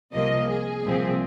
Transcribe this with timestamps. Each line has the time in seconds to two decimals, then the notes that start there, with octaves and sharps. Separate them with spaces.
0.13 C2 C3 F3 A#3 D#5
0.48 G#4
0.84 C2 A#2 F3 C4